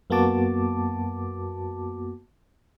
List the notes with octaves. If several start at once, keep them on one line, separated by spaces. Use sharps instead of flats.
F#2 A#3 B3 F#4 A5 D6